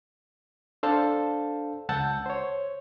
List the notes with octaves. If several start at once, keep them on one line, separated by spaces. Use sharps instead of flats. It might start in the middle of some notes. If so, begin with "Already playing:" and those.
D4 A4 C5 F5 A5
C#2 F#5 A5 E6 G6
C5 C#5